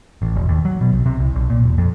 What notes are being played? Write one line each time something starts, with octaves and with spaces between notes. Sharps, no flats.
A1
E1
D#2
F#3
B2
B1
C3
C2
B1
A#2
E1
F2